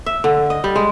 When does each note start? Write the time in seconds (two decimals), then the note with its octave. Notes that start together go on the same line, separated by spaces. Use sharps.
0.06 E5
0.24 D3
0.50 D#5
0.64 G3
0.76 G#3